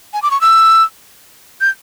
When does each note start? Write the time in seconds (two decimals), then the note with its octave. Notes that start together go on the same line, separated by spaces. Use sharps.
0.13 G#5
0.23 D6
0.31 C#6
0.41 E6
1.61 G6